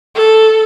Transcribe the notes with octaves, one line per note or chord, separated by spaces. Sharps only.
A4